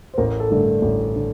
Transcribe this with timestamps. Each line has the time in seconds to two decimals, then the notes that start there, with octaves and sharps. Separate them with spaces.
0.14 C5
0.18 A1 A#4
0.40 A4
0.51 G2 D3 A3
0.82 A1
1.16 D3